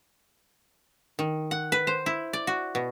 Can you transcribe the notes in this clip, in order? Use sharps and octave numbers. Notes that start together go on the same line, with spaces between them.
D#3
F#5
B4
C5
E4
D5
F#4
B2